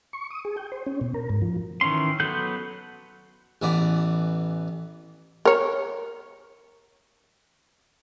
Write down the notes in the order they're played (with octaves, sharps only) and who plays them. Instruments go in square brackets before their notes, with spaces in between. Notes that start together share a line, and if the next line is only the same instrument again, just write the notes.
[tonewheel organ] C#6
D#6
G#4
G5
C5
C#4
B2
A#4
G#2
F3
[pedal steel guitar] D#3 E3 C#4 C6
F#3 B3 A4 F#6 G6
[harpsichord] A1 E3 B3 D5
[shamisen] A#4 C#5